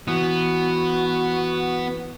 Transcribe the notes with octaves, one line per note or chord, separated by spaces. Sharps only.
E3 B3 F#4